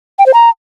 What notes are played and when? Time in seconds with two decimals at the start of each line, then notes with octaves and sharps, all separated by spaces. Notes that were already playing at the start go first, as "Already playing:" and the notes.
0.19 G5
0.26 C5
0.34 A#5